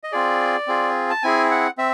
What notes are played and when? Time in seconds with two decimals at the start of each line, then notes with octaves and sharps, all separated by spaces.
0.04 D#5
0.12 C4 F4 G#4 D5
0.67 C4 F4 G#4
1.10 A5
1.23 C4 E4 G#4 G#5
1.51 F#5
1.78 C4 E5